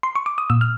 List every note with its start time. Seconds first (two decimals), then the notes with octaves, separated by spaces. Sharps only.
0.03 C6
0.15 C#6
0.26 D6
0.38 D#6
0.50 A#2 E6
0.61 F6